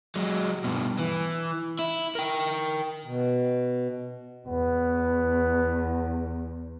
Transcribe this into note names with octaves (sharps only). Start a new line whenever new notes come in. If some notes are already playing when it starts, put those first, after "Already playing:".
F#3 G#3
G2 B2
E3
E4
A#4 G5
B2
E2 B3